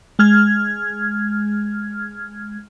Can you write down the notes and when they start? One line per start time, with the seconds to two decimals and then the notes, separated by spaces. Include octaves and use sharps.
0.19 G#3 F6 G#6